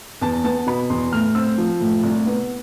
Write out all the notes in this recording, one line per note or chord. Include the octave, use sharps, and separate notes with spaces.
E2 A5
B3 A5
B2 B5
E2 C6
A2 F6
C4 E6
F3
A2
C2
B3